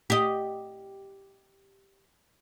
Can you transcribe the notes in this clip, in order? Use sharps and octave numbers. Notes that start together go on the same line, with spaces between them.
G4 D#5